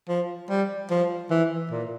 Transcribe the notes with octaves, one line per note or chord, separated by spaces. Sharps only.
F3
G3
F3
E3
A#2